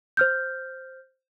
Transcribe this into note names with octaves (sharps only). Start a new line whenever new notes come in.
C5 F6 G6